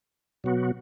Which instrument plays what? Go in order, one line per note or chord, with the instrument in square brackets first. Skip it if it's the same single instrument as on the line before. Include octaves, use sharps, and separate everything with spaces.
[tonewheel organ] B2 F#3 B3 F#4